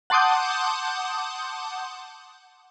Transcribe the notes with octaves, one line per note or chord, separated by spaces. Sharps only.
F#5 A5 C6 D6 D#6 G6